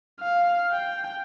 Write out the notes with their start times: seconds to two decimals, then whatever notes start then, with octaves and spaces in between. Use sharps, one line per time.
0.20 F5
0.72 G5